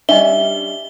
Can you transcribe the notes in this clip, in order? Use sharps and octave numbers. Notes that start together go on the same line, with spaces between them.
G3 C#4 D4 D#5 E5 G7